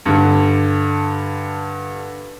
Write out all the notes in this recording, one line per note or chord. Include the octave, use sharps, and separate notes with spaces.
G2 D3